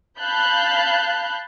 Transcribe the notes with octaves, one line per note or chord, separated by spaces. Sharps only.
F5 A5 B5 F#6 G6